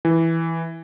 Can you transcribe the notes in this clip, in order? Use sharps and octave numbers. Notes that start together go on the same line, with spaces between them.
E3